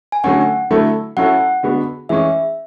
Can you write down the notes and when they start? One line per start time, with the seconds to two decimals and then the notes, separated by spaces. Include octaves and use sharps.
0.12 G#5
0.24 D3 F#3 A3 C#4 F#5
0.70 D3 F#3 A3 E4 A4
1.17 F#3 C#4 E4 A4 F#5
1.63 D3 G#3 B3 F#4
2.09 E3 G#3 C#4 G#4 E5